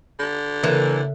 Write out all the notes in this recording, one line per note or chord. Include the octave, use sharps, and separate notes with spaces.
D3
C#3 E3 A#3 A4